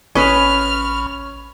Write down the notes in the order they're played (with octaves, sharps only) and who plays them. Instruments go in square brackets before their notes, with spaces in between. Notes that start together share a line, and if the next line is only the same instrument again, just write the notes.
[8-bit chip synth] A1 B5 C#6 [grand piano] C#4 [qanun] B4 D#5 [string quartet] F6